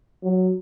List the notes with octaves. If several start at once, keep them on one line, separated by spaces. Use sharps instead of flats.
F#3